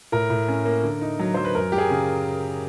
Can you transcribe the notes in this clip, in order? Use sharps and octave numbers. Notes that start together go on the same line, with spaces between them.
A2 A#4
A2
C#4
A#3
D3
D#4
F#3
F#3 C5
B4
F#2 A#4
F#2 G4
G#4
C#3